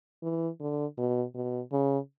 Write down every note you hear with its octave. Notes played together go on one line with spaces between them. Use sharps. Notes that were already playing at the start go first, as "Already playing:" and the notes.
E3
D3
B2
B2
C#3